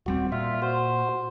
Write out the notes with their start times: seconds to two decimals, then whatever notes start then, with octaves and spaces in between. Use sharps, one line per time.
0.06 D#1 G3 C4 F#4
0.32 A#2 F4 E5
0.62 F#4 C5